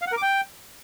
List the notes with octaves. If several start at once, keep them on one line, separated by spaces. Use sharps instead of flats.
F5
F#5
A#4
D6
G5